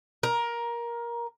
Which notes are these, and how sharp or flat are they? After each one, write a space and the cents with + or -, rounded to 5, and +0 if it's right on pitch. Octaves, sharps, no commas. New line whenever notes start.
A#4 +15